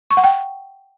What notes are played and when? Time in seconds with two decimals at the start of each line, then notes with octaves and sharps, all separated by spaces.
0.11 C#6
0.17 F#5
0.24 G5